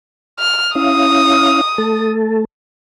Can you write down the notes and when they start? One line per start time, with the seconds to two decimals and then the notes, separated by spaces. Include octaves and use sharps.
0.39 F6
0.75 C#4 E4 F5 D#6
1.78 A3 A4